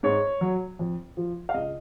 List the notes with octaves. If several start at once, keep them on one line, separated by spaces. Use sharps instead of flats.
G#2 C#5
F#3
F2
F3
F5
C#2 D#5